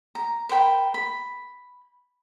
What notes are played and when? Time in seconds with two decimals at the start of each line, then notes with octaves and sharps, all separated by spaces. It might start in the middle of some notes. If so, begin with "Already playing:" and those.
0.15 A#5
0.49 A#4 C5 G5 B5
0.94 B5